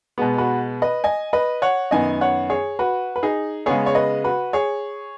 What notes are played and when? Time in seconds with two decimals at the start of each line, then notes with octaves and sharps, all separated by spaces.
0.18 B2 G#3 B3
0.38 F#4 B4
0.82 B4 D#5
1.04 D#5 G#5
1.33 B4 D#5
1.62 C#5 F#5
1.91 F#2 D#3 B3 D#5 G#5
2.21 C#5 F#5
2.50 G#4 C#5
2.79 F#4 B4
3.16 B4
3.23 D#4 G#4
3.66 C#3 G#3 B3 G#4 C#5
3.86 C#5
3.95 B4 D#5
4.24 F#4 B4
4.53 G#4 C#5